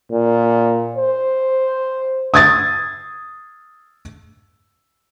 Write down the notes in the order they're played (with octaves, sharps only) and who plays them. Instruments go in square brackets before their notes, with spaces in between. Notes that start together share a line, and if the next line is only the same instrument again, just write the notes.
[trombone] A#2
C5
[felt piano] D#6 G#6 A6